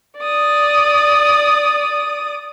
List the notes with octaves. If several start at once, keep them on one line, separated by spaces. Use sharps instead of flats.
D5 D#6